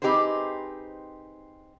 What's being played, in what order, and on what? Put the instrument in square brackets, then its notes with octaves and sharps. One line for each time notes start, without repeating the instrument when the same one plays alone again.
[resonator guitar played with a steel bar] C4 D#4 G4 G#4 B4 C5